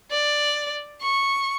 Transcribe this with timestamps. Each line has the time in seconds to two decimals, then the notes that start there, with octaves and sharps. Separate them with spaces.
0.11 D5
1.02 C#6